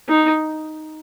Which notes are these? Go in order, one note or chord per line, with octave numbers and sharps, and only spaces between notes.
D#4